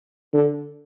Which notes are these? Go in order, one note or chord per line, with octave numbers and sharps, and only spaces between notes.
D3